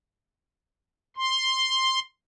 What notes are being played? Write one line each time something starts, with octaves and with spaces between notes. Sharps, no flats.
C6